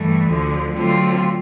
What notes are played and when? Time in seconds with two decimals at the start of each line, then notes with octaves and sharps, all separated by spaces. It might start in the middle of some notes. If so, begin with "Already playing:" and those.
Already playing: G2 E3 A3
0.27 D2 D3 F3
0.72 D3 F#3 A3 C4 F4